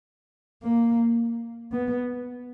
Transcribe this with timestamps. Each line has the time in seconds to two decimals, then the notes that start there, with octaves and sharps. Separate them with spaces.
0.63 A#3
1.72 B3